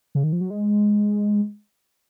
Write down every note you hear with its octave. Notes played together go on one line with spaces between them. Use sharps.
C#3
D#3
F3
F#3
G#3